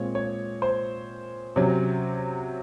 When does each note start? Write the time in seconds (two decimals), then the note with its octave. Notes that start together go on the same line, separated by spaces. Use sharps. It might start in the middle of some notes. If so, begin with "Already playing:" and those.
Already playing: A#2 G#3 C4 C#5
0.15 C#5
0.62 C5
1.56 C3 F#3 C#4